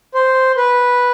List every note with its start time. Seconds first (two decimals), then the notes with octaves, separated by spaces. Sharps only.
0.14 C5
0.57 B4